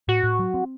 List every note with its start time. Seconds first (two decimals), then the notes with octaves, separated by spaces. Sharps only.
0.08 A2 F#4
0.23 A2
0.39 F#3
0.54 C4